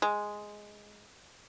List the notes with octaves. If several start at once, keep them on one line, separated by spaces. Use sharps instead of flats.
G#3